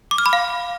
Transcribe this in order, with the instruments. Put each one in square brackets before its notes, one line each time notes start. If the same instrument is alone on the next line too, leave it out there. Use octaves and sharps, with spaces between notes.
[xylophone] D6
F6
B5
F5